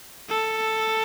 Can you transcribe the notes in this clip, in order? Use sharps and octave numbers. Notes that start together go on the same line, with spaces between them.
A4